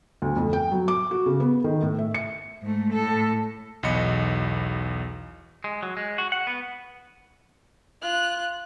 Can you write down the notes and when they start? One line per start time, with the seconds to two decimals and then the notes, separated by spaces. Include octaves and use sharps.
0.22 D2
0.37 F2
0.53 G5
0.72 F#3
0.88 D6
1.11 F#4
1.26 C#3
1.40 B3
1.64 D#3
1.82 A2
1.99 E5
2.14 C#7
2.62 G#2 A3
2.93 A2 A4
3.83 B1 E2 D#5 B5 C#7
5.64 G#3
5.83 F#3
5.97 G#3
6.18 F#4
6.32 F#5
6.47 B3
8.02 F4 F#6